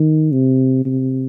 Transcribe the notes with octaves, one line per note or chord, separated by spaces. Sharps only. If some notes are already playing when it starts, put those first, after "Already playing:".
Already playing: D#3
C3
C3